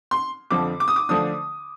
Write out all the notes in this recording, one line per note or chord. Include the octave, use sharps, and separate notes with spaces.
C6
F2 D3 F3 D6
D6
D#6
D6
D3 F3 A3 D4 D#6